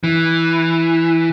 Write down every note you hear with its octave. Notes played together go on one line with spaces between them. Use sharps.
E3